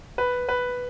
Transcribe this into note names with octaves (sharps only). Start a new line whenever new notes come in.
B4
B4